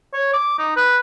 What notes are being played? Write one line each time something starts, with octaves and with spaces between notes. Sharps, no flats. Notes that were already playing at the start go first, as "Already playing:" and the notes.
C#5
D6
D#4
B4